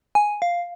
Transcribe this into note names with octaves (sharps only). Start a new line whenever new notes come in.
G#5
F5